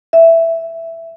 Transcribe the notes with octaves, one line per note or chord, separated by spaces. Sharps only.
E5